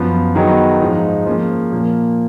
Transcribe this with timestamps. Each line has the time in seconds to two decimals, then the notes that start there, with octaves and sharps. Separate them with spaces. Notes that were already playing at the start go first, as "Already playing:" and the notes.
Already playing: F#2 F3 B3
0.35 D#3 F#3 B3 D#4 G#4
0.81 G#2 F3 G#3 D#4
1.26 F3 A#3 C#4 G#4
1.72 A#2 F3 A#3